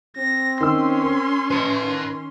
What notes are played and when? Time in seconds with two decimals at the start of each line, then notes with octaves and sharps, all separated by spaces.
0.17 C4 A#6
0.61 D#3 C#4 C6 E6
1.03 A#4
1.51 B4 A5
1.81 D#3